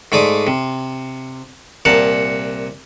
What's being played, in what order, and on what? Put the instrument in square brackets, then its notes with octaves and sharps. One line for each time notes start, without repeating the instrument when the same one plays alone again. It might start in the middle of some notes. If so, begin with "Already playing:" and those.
[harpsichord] G#2 A3 D5 D6 D#6
C3
C2 A#2 A#4 F#5 A5